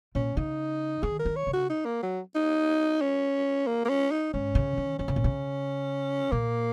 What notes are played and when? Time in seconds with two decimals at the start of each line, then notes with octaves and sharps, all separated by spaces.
0.15 A#2 C#4
0.37 C#3 D#4
1.03 D#3 G#4
1.19 A#4
1.25 D#3
1.36 C#5
1.47 C#3
1.53 F#4
1.70 D#4
1.85 A#3
2.03 F#3
2.35 D#4
3.01 C#4
3.67 A#3
3.85 A#3
3.89 C#4
4.11 D#4
4.34 G#2 C#4
4.55 C#3
4.77 D#3
4.99 D#3 C#4
5.08 C#3
5.16 A#2
5.24 C#3
6.31 A#2 A#3